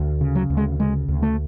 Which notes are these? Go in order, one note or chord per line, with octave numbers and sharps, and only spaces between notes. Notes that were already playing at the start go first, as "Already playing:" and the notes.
Already playing: D2
C#3
F#3
D2
G#3
C#3 G#3
D2
A3